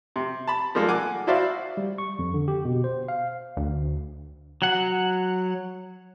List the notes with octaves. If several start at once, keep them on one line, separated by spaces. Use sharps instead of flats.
C3
A5 B5
F3 G3 G#3 A#3 D#4 A4
F#5 G#5 D6
E4 F#4 C5 D5 E5 F5
G3
C#6
F2
D3
G4
B2
C5
F5
D2
F#3 F#5